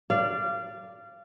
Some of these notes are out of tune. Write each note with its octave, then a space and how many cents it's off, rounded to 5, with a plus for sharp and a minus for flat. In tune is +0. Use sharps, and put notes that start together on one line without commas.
D5 +0 F5 -25